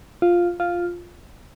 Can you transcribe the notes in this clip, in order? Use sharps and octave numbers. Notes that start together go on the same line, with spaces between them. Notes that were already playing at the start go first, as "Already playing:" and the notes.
F4
F4